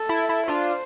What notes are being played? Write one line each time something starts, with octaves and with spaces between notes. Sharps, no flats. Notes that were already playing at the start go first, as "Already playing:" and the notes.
Already playing: A4
E4
E4
D4 F4 C5